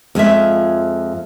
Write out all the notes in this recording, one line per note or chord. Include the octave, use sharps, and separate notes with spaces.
F2 G#3 F4 E5